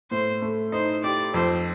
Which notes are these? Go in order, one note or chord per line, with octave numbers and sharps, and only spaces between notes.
A2 C5
A3
D#4 C5
G4 D5
F2 C5